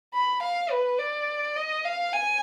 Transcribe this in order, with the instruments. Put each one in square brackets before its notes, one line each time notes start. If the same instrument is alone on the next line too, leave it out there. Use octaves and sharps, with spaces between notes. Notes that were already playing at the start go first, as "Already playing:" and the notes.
[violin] B5
F5
B4
D5
D#5
F5
G#5